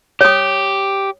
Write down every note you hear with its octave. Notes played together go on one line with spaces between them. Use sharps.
G4 C#5 D#6